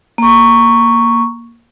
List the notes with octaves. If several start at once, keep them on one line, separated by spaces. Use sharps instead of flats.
A#3 C#6